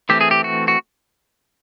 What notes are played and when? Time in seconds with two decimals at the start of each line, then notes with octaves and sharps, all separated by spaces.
0.09 E3 A3 C4 G4
0.21 G#4
0.31 G4
0.44 F#4
0.68 F#4